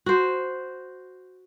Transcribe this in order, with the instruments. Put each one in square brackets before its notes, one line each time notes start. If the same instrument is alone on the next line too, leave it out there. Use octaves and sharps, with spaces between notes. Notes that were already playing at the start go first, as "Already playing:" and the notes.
[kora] F#4 C5